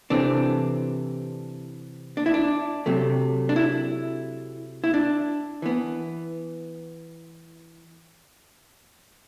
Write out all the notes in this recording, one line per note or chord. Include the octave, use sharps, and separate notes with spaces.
C3 E3 A3 C4 D4
D4
E4
D4
C3 F#3 A3
D4
E4
E4
D4
E3 B3